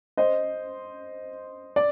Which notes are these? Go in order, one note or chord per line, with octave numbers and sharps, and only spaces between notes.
C5 D#5
D5